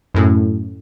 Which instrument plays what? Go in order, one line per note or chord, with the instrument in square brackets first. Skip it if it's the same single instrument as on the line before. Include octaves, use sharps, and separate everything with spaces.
[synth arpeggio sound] F#2 A2